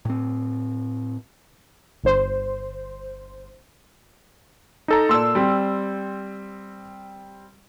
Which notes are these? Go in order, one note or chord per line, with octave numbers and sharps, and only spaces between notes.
A2 C4
G1 C5
D#4 A4 A#5
A#2 A4 D5 C6 E6
G3 C4